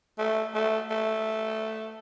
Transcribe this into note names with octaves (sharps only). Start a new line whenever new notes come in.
A3
A3
A3